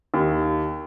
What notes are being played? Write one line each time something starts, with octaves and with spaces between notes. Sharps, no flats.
D#2